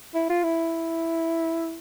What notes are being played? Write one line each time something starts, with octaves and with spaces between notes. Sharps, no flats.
E4
F4
E4